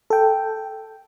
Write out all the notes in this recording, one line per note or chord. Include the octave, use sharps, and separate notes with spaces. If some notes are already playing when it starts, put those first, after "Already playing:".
A4 G5